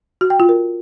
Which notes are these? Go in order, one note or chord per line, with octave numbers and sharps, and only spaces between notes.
F#4
G5
F4
A#4